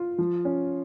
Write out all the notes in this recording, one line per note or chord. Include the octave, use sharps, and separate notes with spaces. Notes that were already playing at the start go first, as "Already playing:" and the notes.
Already playing: F4
F3
C#4